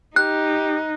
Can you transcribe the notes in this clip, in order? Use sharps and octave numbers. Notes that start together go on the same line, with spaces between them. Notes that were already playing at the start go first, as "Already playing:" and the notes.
D#4 G4 F#6